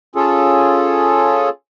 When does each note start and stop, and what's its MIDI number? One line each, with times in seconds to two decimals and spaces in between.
0.15 1.49 61
0.15 1.49 65
0.15 1.49 68
0.15 1.49 69